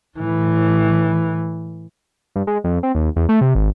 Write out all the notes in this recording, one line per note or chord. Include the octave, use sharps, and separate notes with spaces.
A2 E3
G2
G#3
F2
C4
D#2
E2
A3
C3
G#1